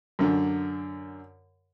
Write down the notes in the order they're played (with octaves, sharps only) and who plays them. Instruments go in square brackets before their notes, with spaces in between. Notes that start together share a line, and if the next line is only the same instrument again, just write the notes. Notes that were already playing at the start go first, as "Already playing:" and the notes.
[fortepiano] F#2 D3